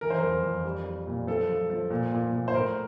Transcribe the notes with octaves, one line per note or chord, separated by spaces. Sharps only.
E3 A#4
C5
F2 A#4
F2
G3
G3
A#2
F3 A4
F3
F3
A#2
A#2
A#2
C5
A2 A#4